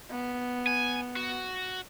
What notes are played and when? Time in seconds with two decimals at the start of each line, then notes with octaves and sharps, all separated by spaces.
0.11 B3
0.67 G#5
1.16 F#4